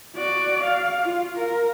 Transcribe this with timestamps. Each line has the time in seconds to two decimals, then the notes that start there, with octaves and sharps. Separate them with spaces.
0.15 F#4 D5
0.64 F5
1.03 F4
1.38 A#4